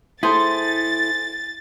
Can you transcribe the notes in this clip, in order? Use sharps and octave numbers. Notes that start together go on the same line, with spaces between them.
E4 G#4 A4 C5 A6